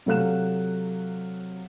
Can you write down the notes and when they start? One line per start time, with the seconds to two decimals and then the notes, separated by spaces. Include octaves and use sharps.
0.06 C3 F#3 A4 F5 F#6 E7